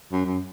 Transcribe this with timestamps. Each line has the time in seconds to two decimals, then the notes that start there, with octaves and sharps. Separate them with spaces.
0.12 F#2
0.25 F#2